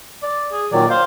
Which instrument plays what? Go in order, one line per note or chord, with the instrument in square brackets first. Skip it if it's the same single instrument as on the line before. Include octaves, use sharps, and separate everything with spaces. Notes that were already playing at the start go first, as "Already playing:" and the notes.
[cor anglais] D5
G#4
[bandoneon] A#2 D#3 F#3 [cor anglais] D5
[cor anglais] C5 [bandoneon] F5